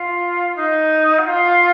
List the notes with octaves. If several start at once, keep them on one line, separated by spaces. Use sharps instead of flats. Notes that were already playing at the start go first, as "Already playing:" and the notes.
Already playing: F4
D#4
F#4
F4